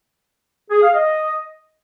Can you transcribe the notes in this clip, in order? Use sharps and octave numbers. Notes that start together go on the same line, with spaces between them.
G#4
F5
D#5